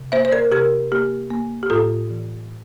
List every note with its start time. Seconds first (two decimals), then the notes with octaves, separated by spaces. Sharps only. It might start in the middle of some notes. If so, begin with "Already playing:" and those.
Already playing: C3
0.12 A#3 C5 E5
0.25 C5
0.32 A#4 D5
0.51 C3 G4 A#4
0.92 A#3 G4
1.30 A#3
1.63 G4
1.70 A2 F4 A4
2.10 E3